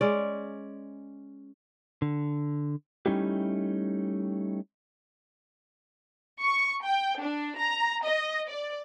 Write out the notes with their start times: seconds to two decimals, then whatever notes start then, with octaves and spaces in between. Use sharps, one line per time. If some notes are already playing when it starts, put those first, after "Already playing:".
0.01 G#3 C#4 D5
2.02 D3
3.06 G3 A3 C#4 D#4 E4 G4
6.41 C#6
6.84 G5
7.21 D4
7.57 A#5
8.05 D#5
8.50 D5